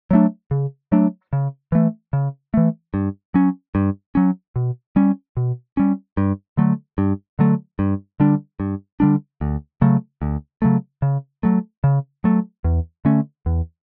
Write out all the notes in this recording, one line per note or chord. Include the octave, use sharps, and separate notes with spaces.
F#3 A3 D4
C#3
F#3 A3 D4
C#3
E3 A3
C#3
E3 A3
G2
F#3 C#4
G2
F#3 C#4
B2
G3 C#4
B2
G3 C#4
G2
D3 F#3 A3
G2
D3 F#3 A3
G2
D3 G3 D4
G2
D3 G3 D4
D2
C#3 F#3 A3
D2
C#3 F#3 A3
C#3
F#3 A3
C#3
F#3 A3
E2
D3 A3 C#4
E2